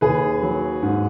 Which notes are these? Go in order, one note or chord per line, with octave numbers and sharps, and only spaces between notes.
D#2 G#4 B4
F#3
G#2